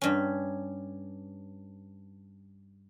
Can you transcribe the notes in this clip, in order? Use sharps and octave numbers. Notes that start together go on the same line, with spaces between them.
G2 C#4